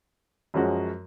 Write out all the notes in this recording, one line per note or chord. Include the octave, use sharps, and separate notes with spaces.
F#2 F3 G#3 C#4 F#4